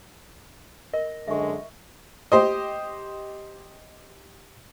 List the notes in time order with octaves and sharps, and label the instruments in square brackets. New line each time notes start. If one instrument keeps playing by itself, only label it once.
[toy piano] A#4 [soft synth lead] D#5
[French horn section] F#2 D3 [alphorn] G#3 [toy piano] E5 C#6
[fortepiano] G4 C5 D#5